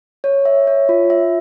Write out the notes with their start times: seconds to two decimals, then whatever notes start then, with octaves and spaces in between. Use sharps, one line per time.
0.24 C#5
0.45 E5
0.67 C#5
0.89 F4
1.10 E5